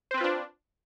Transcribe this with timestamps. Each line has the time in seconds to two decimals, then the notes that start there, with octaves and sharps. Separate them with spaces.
0.11 C5
0.14 C4
0.17 B4
0.21 F4
0.24 D4